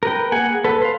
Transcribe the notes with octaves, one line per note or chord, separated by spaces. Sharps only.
A#4 B4 G5
A#3 G#4 F#5 G#5
A4 B4
C5 F5